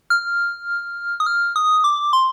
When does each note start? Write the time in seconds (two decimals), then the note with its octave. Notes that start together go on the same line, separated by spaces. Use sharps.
0.10 F6
1.20 D#6
1.26 F6
1.56 D#6
1.84 D6
2.13 C6